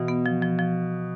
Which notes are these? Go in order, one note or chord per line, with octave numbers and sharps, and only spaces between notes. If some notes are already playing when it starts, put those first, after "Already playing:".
Already playing: B2 E3
B3
F3
F3
F3